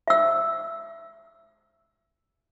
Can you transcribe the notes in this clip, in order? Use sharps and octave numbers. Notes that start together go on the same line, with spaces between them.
E5 E6